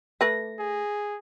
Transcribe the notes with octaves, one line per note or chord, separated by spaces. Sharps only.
A3 A4 B4 A#6
G#4